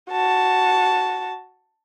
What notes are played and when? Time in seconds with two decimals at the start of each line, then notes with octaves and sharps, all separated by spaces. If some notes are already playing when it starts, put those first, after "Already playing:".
0.11 F#4 A5